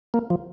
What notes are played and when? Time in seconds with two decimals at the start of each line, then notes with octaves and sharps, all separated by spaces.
0.14 A#3
0.30 F3